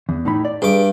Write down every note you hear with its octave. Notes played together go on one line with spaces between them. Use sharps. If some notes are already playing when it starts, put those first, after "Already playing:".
E2
A2 D#4 B5
D5
G2 G#4 D6